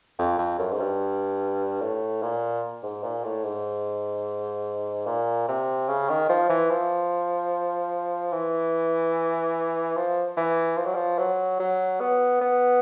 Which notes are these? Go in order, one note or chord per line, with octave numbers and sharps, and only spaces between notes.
F2
F2
F#2
G#2
G2
A2
A#2
G#2
A#2
A2
G#2
A#2
C3
C#3
D#3
F3
E3
F3
E3
F3
E3
F3
F#3
F3
F#3
F#3
B3
B3